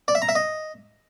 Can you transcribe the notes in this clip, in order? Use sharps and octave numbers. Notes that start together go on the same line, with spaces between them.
D5
E5
A#5
E5
D#5